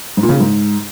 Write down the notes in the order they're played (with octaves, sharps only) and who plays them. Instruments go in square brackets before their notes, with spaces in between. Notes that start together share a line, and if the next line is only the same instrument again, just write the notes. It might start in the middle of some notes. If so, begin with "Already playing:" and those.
[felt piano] G#2
A#2
C#3
A#2
G#2